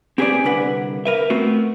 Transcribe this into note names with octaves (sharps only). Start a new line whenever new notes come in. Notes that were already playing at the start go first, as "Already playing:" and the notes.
C4 G4 G#4 B4 C5 D5
C2 D3 D4 B4 F#5
A#4 B4 E5
A3 B3 C4 F#4